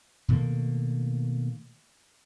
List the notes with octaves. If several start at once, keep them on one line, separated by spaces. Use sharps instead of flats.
B2 D#3 A3 A#3